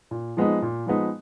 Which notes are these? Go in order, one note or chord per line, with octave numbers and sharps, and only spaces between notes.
A#2
F3 G#3 B3 D#4
A#2
F3 G#3 B3 D#4